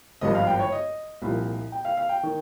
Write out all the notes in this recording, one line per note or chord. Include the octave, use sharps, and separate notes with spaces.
G#1 G2 F3 D#5
F5
G5
C#5
D#5
C2 A#2 F3
G5
F5
F5
G5
D#3